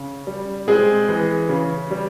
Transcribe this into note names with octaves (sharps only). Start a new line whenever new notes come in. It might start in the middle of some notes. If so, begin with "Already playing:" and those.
Already playing: C#3
G3
G#3 C4 G#4
E3
C#3
G3